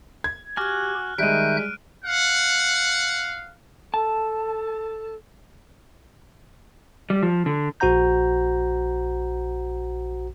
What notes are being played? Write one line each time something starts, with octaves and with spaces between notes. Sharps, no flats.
G#6
F#4 G4 G#5 F6 F#6
D#3 G3 G#3 E5 F#6 G6 D7 D#7
F5 F#5
A4 A5
G3
F3
D3
A#1 F#4 C5 F#5 A#5 G6